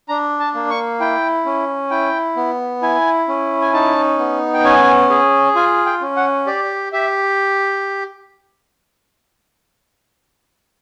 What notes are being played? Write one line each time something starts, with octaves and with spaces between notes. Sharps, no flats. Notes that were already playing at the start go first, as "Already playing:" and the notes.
D4 A#5
A5
A#3
C#6
E4 G5
C#4
E4 G5
B3
E4 G#5
C#4
G#5
D#4 A5
B3
G5
C#4 G#5
G#4
F4 G#5
G5
C#4
F#5
G4 D5
G4 E5